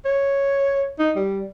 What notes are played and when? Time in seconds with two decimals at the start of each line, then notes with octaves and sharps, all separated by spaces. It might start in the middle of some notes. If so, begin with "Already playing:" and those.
0.05 C#5
0.99 D#4
1.16 G3